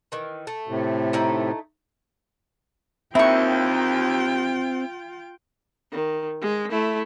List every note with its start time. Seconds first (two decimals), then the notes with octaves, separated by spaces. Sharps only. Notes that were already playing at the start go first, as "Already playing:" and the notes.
0.12 D#3 E3
0.47 A3
0.68 A2 C3
1.13 A3 D#4 E4
3.15 D#2 C4 E4 F4 G5 C#6
5.92 D#3
6.41 G#3
6.70 A3 E4